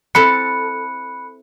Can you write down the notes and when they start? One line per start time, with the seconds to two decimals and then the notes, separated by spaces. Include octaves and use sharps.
0.15 C4 E4 A4 B5 F#6 C#7